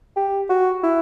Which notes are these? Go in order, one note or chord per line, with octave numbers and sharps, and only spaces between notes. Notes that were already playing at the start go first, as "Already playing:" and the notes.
G4
F#4
E4